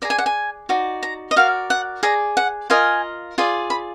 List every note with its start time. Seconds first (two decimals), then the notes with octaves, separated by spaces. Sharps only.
0.02 G#4 D5 A#5
0.10 G#5
0.18 F#5
0.26 G#5
0.69 D#4 F#4 D5
1.03 A#5
1.31 D#5
1.36 F#4 A#4 D5 F5
1.70 F#5
2.03 G#4 D5 A#5
2.37 F#5
2.70 F4 A#4 D#5 G#5
3.38 F4 G#4 D5
3.70 B5